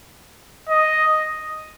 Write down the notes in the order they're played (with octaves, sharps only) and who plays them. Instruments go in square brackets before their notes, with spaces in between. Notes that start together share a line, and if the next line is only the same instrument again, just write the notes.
[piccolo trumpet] D#5